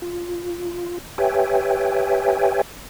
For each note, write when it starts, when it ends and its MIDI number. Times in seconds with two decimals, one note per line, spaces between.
0.02 0.98 65
1.18 2.62 67
1.18 2.62 71
1.18 2.62 73
1.18 2.62 76
1.18 2.62 79
1.18 2.62 80